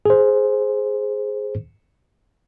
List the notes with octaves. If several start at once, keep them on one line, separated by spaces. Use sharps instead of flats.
G#4 C5